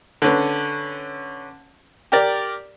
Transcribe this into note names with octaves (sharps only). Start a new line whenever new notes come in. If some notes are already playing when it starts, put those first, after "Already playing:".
D3 C#4 B4
G4 A#4 D5